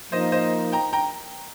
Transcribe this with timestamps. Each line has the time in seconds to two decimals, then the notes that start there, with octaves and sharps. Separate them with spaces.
0.12 F3 A#3 D#4 C5 D#5
0.32 C5 D#5
0.72 G5 A#5
0.93 G5 A#5